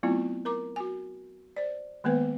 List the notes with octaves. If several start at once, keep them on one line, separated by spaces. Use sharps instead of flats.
F#3 A3 B3 C4 E4 F4
A#4 A#5 D6
F#4 G#5
C5 D5
D#3 G#3 A#3 B3 B4